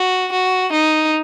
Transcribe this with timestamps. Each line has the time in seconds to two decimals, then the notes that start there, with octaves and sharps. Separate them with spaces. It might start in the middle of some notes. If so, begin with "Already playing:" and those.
Already playing: F#4
0.32 F#4
0.72 D#4